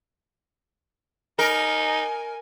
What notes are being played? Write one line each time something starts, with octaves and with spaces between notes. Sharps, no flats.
D#4 A#4 G#5